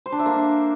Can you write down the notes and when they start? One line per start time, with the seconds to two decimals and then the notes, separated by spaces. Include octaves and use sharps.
0.06 C5
0.12 D4
0.19 E5
0.26 A#3